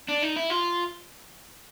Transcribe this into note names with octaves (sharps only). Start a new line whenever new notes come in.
D4
D#4
E4
F4